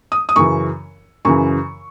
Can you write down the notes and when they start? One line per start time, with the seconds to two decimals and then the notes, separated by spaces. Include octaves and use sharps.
0.12 D#6
0.29 D#6
0.36 F#2 C#3 E3 C#6
1.25 F#2 C#3 E3 C#6